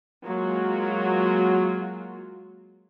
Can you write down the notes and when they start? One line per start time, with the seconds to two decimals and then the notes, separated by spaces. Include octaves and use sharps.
0.25 F#3 G#3 A#3 F4 F#4